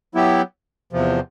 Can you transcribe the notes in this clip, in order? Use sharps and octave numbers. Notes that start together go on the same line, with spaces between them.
F#3 B3 E4 G4
E2 C3 F3